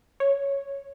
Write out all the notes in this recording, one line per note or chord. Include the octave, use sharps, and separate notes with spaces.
C#5